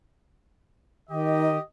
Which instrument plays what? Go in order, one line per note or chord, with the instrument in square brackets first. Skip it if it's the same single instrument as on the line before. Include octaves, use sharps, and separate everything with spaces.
[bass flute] D#3 [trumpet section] G4 D#5